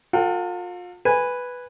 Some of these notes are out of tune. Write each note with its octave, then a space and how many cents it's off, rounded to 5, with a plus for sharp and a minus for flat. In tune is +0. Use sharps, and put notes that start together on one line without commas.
F4 +35 A4 +45 G5 -30
B4 +0 G#5 -15